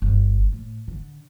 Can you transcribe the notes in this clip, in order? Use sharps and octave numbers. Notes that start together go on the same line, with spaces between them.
G1
A2
D3